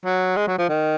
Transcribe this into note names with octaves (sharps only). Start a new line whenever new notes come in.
F#3
G#3
F#3
F3
D#3